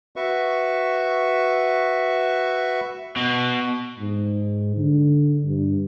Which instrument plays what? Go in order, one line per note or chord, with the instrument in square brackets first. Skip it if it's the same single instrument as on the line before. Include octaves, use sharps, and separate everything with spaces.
[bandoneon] F#4 B4 E5 C#6
[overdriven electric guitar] B2
[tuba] G#2
D3
G2